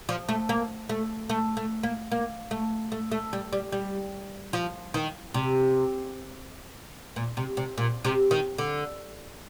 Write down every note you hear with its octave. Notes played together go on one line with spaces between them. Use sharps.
F3
A3
A#3
A3
A3
A3
A#3
A#3
A3
A3
A3
G3
G3
G3
F3
D#3
C3
A#2
C3
C3
A#2
C3
D#3
D3